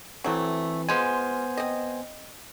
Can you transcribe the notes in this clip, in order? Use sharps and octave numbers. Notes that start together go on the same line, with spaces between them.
E3 F#3 A3 C4
G#3 B3 F4 C5 G#5
C4 D#5